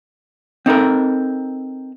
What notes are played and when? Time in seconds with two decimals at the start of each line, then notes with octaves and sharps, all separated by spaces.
0.66 C4 D#4 A4 A#4